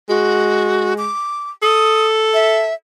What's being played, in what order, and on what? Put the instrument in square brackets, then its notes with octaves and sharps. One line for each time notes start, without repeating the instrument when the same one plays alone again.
[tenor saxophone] G#3 [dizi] F#4
[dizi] D6
[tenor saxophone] A4 [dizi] D#6
[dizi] E5